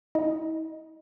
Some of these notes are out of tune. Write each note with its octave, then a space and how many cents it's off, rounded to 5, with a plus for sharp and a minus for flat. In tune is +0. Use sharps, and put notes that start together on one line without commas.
E4 -45 D#5 +0